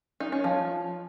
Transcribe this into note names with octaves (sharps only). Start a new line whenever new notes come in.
D#4
C#4
F3